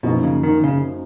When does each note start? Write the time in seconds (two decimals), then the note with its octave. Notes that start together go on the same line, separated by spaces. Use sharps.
0.03 F#2 B2 F3 A#3 D#4
0.24 C#3
0.43 D#3
0.64 C#3